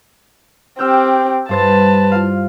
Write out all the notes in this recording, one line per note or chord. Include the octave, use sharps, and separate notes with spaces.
C4 G4 E6 F6 G6
G2 B4 C5 A5 A6
F4 F5